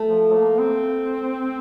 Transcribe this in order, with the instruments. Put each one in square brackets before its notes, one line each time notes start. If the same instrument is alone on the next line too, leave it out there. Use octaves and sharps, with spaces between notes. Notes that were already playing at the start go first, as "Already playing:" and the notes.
Already playing: [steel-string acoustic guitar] A3
[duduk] F3
A#3
C4